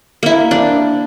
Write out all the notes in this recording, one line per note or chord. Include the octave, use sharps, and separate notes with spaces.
A#3 E4
D4